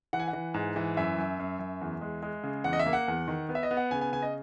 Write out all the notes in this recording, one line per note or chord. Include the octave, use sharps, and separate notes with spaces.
E3 F#5
G#5
F#5
E3
G#2
E3
F#2 E5
F#2
F#2
F#2
E2
G#3
G#3
C#3
E2 F#5
D#5
E5
A#3
F#5
E2
D#3
B3
E5
D#5
B3
F#5
C#3 G#5
G#5
C#3 G#5
D#5